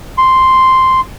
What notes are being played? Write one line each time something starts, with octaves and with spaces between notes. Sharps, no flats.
C6